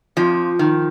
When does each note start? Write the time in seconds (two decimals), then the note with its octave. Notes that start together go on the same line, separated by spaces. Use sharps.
0.17 F2 F3
0.59 D#3